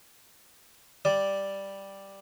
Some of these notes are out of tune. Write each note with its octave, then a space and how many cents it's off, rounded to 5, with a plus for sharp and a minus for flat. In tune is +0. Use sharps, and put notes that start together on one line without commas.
G3 +0 D5 +0